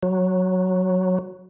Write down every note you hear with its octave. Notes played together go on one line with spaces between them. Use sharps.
F#3